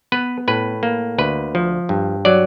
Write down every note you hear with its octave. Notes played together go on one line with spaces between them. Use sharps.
B3 B4
A2 B4
A#3
D2 B4
F3
G2
F#3 D5